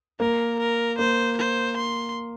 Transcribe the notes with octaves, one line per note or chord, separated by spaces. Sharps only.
A#3 A#4
A#4
A#3 C5
C5
C6